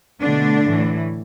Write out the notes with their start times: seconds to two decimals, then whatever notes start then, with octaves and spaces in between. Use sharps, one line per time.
0.21 B2 D3 A3 D4
0.64 A2 E3 A3